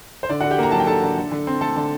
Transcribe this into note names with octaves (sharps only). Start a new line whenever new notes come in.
C5
D3 D5
D3 F#4 F#5
G4 G5
A#3 A#5
F#3 A5
G5
D3 A4 A5
D3
D3
D3
C4
A3 A4 A5
D3